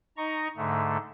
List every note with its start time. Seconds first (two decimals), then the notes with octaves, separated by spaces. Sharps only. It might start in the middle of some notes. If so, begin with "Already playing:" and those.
0.17 D#4 D#5 A#5 C#6
0.57 G#2 D3 A3